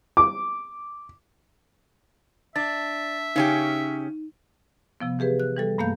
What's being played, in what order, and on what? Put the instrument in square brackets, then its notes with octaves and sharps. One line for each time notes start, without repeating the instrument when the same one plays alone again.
[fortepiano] D6
[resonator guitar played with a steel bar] D4 [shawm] E5 [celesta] A6
[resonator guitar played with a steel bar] C#3 C#4 G4 [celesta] D#4
[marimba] C3 F3 B3
E3 G4 G#4 B4
F#6
E3 G3 A4
G2 A3 A#3 F5 G6